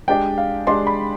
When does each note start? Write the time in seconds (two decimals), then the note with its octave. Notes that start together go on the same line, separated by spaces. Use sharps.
0.08 G#3 D4 G4 D5 G5
0.38 F5
0.67 G#3 D4 G4 D5 C6
0.87 B5